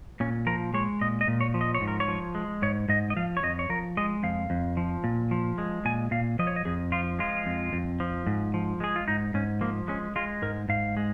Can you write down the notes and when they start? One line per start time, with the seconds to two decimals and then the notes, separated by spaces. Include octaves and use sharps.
0.20 A#2 C#4
0.47 F3 A#4
0.74 G#3 C#5
1.01 A#2 D#5
1.21 D#5
1.28 A#2
1.41 C#5
1.54 F3
1.61 D#5
1.75 C#5
1.81 G#2
1.88 A#4
2.00 C#5
2.08 F3
2.35 G#3
2.62 G#2 C#5
2.89 G#2 D#5
3.10 D#5
3.17 F3 F5
3.37 C#5
3.43 F2 D#5
3.59 C#5
3.69 F3 A#4
3.97 G#3 D#5
4.23 F2 F5
4.50 F2
4.77 F3
5.04 A#2
5.31 F3
5.58 G#3
5.85 A#2 G#5
6.11 A#2 F5
6.39 F3 D#5
6.47 C#5
6.56 D#5
6.65 F2 G#4
6.92 F3 F4
7.19 G#3 F4
7.46 F2
7.73 F2
8.00 F3
8.27 G#2
8.54 F3
8.80 G#3 G#4
8.96 F4
9.08 G#2 D#4
9.34 G#2 C#4
9.61 F3 A#3
9.88 G#3 C#4
10.16 G#3 F4
10.42 G#2 A#4
10.69 G#2 F5
10.97 G#3